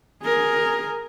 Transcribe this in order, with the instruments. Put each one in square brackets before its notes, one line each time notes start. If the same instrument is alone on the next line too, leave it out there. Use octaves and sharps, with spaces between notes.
[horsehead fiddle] G#4 A#4